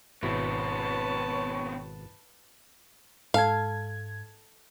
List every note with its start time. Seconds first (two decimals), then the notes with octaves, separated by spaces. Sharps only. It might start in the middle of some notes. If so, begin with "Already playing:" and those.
0.23 G#1 B2 B3 C4 E4 B4 C#5 A5
3.34 G#2 A4 F5 A5 G#6